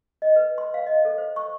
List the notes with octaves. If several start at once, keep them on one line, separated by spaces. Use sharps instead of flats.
D#5
B4
C6
F5
D#5
A4
C5
C#6